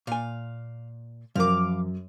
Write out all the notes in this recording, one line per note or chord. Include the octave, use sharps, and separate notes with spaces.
A#2 F5 G#5
F#2 F3 A#4 F5 D6